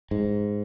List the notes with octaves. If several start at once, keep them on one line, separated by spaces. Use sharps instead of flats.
G#2